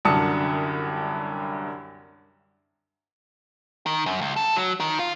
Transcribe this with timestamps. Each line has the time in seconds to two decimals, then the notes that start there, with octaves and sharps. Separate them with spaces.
0.05 C2 F#2 D3 A5 D#6 C#7
3.86 D#3
4.06 F#2
4.21 C#2
4.36 A4
4.56 F#3
4.80 D#3
5.00 F4